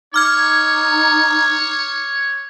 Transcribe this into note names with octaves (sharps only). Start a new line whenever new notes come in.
D#4 C#5 D6 F6 G#6